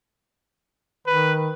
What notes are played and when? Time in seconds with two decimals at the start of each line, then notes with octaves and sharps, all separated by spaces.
1.07 D#3 B4